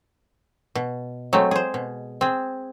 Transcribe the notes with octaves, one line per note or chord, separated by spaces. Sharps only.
B2
F#3 G#3 A3 C4
G#4 C5
B2
C4 G#4